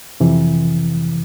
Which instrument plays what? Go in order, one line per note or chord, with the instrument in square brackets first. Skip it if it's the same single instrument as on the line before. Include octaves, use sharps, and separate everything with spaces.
[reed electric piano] F2 C3 E3